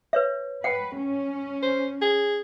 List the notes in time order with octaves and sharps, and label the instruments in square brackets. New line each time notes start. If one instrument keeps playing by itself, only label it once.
[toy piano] B4 C#5 E5
[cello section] B4 [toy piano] F#5 G5
[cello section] C#4
[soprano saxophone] C5
G#4